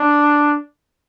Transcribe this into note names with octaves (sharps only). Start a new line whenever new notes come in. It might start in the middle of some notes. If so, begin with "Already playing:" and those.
Already playing: D4